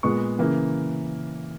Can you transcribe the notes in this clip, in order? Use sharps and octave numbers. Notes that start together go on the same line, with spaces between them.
A#2 G#3 B3 C#6
C#3 E3 A#3